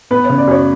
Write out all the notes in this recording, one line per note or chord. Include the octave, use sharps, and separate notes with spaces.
B3 B4
C#3 C#5
D5
F#2 C#5